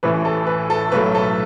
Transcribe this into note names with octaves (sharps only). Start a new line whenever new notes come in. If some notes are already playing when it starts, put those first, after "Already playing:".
A1 A2 E3 B4
A4
B4
A4
B1 A2 F#3 A3 B4
A4